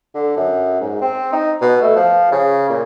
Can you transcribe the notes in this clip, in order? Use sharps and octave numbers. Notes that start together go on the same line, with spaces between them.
D3
F#2
G#2
C4
D#4
B2
A3
F3
C#3
A#2